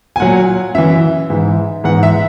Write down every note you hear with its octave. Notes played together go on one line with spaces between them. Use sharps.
G#5
A#2 F#3 F#5
F#2 E3 E5
G#2 E3
G#2 E3 F#5
E5